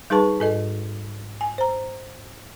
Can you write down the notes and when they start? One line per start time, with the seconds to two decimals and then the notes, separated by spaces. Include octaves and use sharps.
0.10 G3 D#4 G#4 B4 A5 C#6
0.40 G#2 A4 D#5
1.41 G#5
1.58 C5 A#5